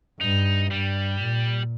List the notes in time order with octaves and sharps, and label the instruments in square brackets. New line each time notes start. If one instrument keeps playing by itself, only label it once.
[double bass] G2 [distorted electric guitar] D#4
[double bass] G2 [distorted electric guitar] G3
[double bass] A#2